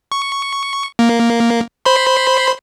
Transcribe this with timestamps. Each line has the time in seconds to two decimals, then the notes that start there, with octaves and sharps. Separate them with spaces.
0.12 C#6
0.99 A#3
1.85 C5 B5 C6